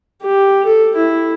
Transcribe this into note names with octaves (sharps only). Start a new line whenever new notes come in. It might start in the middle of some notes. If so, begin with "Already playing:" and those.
G4
A4
E4